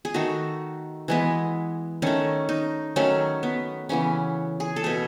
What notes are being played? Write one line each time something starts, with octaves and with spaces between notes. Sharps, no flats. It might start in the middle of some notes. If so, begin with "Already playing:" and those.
G#4
D#3 A3 F#4
E3 G#3 B3
D#3 A3 C#4
D#4
D#3 F#3 A3 C#4
B3
C#3 E3 B3 C#4
G#4
A4
B2 A3 G#4